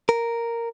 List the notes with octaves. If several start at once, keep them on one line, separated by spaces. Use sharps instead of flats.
A#4